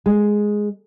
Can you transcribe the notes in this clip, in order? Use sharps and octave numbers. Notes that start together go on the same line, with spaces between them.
G#3